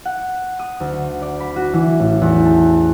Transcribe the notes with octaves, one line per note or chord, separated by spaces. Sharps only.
F#5
D#6
D2
D5
B5
F#4
E3
A1
E2
A4